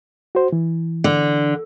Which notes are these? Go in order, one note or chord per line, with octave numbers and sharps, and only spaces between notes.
F#4 C5
E3
D3